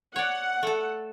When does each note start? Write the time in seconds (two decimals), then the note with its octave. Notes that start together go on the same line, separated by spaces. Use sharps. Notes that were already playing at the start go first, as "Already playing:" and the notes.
0.16 C#5 D5 F#5
0.63 A3 A4